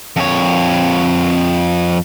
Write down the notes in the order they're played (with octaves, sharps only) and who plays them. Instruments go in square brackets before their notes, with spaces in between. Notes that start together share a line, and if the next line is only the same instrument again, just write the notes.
[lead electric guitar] F2 C#5